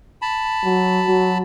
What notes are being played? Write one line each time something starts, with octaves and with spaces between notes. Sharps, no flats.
A5 B5
F#3
F#3